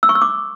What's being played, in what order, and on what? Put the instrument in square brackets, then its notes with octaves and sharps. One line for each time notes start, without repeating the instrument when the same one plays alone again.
[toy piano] E6
C#6
E6
D6